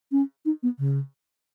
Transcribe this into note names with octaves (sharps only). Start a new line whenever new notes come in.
C#4
D#4
B3
C#3